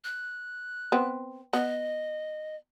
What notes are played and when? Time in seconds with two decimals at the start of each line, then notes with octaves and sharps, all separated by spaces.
0.04 F#6
0.92 B3 C4
1.53 B3 D#5